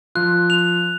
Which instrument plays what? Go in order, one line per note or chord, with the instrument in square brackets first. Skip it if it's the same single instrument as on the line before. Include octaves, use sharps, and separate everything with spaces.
[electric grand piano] F3 F4 [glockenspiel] F#6
[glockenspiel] F7